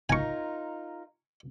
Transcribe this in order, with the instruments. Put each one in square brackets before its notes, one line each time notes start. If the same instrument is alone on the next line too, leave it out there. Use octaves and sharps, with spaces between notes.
[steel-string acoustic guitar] D#4 F4 A#4 [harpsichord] G#5 C#6